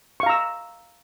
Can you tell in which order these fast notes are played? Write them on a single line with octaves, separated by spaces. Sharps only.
C#6 F5 A#5 E6